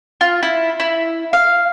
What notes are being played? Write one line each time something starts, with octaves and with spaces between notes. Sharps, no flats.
F4
E4
E4
F5